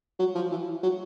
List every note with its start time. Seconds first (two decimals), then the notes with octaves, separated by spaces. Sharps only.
0.19 F#3
0.35 F3
0.51 E3
0.83 F#3